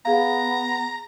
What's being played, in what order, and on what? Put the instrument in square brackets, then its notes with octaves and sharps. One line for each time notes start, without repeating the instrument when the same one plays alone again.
[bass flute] B3 [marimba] G#4 F5 [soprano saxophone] A#5